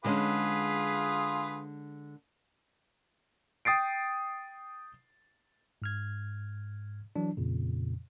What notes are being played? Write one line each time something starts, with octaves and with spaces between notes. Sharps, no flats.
D3 G#3 C#4 F4 G#4 B4
G5 D#6 A6 C7 D7
G#2 F6 G#6
E3 F#3 D4
F2 A#2 C#3